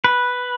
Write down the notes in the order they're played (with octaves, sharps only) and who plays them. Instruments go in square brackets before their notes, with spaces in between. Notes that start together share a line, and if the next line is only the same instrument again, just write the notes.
[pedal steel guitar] B4